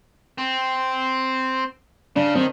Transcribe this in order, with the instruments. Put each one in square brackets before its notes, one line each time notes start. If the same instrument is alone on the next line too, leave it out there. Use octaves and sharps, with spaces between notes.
[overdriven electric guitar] C4
[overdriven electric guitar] C#3 [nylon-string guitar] D4
[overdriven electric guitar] D#3 [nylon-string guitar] C4